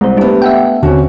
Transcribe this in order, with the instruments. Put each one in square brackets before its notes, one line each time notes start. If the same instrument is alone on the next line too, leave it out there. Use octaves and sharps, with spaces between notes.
[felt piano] C2 [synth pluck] G#3 C5
[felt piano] A3 B3 [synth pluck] D4 G4
[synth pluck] E5 F#5 G5
[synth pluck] D#2 D3 [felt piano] C4 C#4 F#4